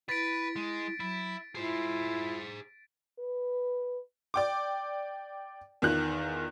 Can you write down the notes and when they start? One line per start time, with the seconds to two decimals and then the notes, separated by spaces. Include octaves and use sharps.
0.09 E4 B4 A6 B6 D7
0.56 G#3
1.00 F#3 E4
1.55 E4 F4 G#4 C5
3.19 B4
4.34 D5 G5 D6
5.82 E2 D#3 F4 F#6